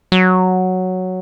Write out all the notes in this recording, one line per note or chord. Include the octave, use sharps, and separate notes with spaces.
F#3